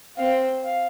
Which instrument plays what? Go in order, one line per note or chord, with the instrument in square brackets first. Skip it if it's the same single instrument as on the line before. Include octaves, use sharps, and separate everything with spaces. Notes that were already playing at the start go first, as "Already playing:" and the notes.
[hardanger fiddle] C4 [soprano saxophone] F5
[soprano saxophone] F5